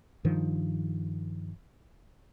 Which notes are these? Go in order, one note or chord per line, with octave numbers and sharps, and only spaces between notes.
G2 D#3 F3